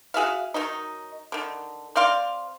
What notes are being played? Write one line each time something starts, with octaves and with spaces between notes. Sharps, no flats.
F#4 G#4 E5 F5
D#3 F#3 D#4
D3 D#3
C4 D5 F5 C6